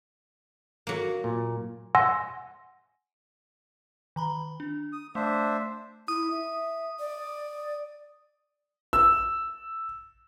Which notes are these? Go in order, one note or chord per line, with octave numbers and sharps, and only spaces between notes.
F#3 A#3
A#2
F#5 G#5 C6 E6 A#6
D#3 A#5 B5
D4
D#6
A3 D4 C5 E5
E4 D#6
E5
D5
E6